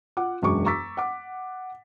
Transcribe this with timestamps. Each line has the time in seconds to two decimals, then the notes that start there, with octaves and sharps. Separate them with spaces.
0.17 F4 F#5 D6
0.42 E1 F#2 G#3 D4 C#6 D6
0.66 A#5 C#6 D6 E6 A6 B6
0.97 F#5 D6